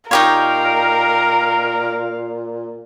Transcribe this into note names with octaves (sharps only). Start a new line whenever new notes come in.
A#2 D#4 G4 A#4 C#5 F5